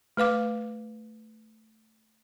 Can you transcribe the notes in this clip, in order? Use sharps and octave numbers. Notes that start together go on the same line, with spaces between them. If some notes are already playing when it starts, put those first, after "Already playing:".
A3 B4 F5 D6